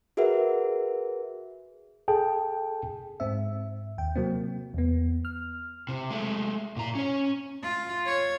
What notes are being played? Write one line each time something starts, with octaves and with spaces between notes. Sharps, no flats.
F#4 G#4 A#4 B4 E5 F#5
G#4 A4 G5 A5
G#2 C4 E5
D#2 G5
C3 F#3 A#3 C4
E2 B3
F6
C3
G#3 A3
A#2 A#5
C#4 C#5
F4
C#5